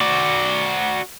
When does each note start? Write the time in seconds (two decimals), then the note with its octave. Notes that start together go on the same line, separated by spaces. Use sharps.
0.01 F#4 D5